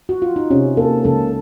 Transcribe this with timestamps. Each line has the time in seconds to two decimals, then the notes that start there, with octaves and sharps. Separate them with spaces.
0.09 F#4
0.22 F4
0.36 D#4
0.50 C3 C#4
0.77 A#3 A4
1.04 C#2 A4